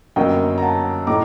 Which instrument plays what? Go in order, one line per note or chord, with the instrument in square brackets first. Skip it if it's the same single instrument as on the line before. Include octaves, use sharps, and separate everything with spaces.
[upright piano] G1 F#2 F#3 A#3 D#5 G5
A#5
F#5 A5
A2 A3 D#4 A#5 D6